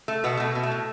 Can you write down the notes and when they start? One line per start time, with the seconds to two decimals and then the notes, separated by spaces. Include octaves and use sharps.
0.08 A3
0.24 B2 B3
0.37 B2 A3
0.55 B2
0.63 A3
0.71 A2